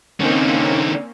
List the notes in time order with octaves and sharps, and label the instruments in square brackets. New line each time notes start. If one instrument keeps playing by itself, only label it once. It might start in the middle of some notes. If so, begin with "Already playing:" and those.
[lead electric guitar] D3 D#4 [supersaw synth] A#3 C4 C#4